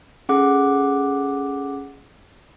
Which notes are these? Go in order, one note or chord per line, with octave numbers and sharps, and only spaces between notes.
C#4 G#4 A4 F#5 D6 F#6